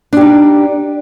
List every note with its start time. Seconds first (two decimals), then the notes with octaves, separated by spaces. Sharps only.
0.13 D4
0.17 G4
0.21 D#4